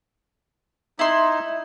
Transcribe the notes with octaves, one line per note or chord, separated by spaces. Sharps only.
D#4 E4 C6